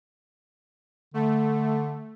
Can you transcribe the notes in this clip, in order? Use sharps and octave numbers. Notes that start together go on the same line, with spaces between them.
D3 A3